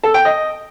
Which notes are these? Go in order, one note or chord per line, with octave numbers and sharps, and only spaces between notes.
A4
G5
D#5